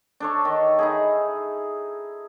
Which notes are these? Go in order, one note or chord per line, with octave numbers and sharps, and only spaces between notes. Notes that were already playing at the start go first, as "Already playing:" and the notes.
D4 A4 C#5
D#3
D#4 E4 G#4